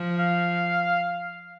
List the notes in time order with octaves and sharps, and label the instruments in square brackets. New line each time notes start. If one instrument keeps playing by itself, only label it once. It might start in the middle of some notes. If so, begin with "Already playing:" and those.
Already playing: [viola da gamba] F3
[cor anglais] F5